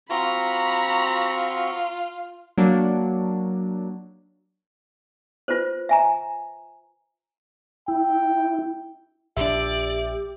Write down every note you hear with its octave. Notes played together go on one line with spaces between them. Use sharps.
C4 F4 F#4 A#5 B5 C#6
F#3 A#3 D4
F4 B4 C5
E5 G#5 A#5
E4 G5
A#1 D4 G4 D5 E5